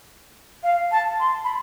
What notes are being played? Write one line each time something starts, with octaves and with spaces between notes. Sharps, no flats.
F5
A5
C6
B5